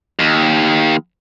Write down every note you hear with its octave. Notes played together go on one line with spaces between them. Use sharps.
D#2